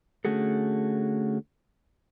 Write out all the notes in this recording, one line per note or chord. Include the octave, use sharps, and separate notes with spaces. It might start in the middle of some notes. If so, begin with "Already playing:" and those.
D3 A3 C#4 F#4 G#4 A4